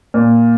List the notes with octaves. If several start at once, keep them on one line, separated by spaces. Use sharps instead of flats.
A#2